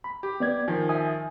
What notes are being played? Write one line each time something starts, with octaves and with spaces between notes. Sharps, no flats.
B5
G4
B3 D5 G#6
D#3 F3 G#5
E5 G#5 D#6